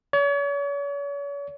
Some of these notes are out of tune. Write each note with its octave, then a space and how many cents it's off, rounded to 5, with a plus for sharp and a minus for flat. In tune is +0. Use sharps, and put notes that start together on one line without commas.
C#5 +40